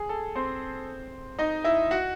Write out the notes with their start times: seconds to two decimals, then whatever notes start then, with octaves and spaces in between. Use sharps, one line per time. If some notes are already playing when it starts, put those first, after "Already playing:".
Already playing: G#4
0.09 A4
0.35 C4 C5
1.39 D#4 D#5
1.64 E4 E5
1.91 F#4 F#5